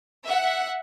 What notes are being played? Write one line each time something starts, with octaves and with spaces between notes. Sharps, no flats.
E5 F#5